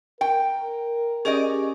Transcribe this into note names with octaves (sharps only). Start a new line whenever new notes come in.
A#4 G5
C#4 G4 G#4 D5 D#5